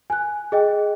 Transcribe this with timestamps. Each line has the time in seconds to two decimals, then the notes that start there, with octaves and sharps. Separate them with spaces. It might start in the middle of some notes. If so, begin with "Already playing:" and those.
0.10 G#5 F#6
0.52 G#4 D#5 G5